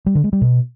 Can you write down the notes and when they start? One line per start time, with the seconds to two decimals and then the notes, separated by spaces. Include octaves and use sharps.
0.06 G3
0.15 D3
0.24 G#3
0.33 G3
0.41 B2